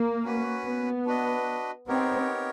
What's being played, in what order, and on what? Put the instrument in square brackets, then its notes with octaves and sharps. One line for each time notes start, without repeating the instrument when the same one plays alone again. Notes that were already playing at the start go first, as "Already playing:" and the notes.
Already playing: [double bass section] A#3
[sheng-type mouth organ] C#4 F#4 B4
[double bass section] B3
[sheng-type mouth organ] D4 F#4 B4 D#5
[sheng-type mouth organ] B3 D#4 G4 A#4 C#5 [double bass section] C4